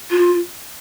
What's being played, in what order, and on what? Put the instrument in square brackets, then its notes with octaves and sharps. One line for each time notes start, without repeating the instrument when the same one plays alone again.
[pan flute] F4